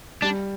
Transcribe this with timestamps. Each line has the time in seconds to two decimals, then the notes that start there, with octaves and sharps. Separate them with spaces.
0.22 G3 D4